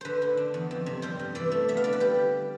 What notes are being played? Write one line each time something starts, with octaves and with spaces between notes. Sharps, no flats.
D3 B4 C5
D3
D4
E2
F2
C3
G3 C5
G2
E3 D5
A3
B3 E5
F5
D3 D5
B4
G3 G4